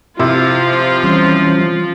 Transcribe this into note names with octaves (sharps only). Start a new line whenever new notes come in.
C3 F3 E4 F4
E3 G3 C#4